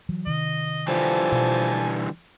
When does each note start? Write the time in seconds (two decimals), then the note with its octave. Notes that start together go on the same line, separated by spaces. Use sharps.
0.09 E3 F#3
0.27 C3 D#3 D#5
0.88 D3 E3 F3 G3 G#5 A5
1.32 B2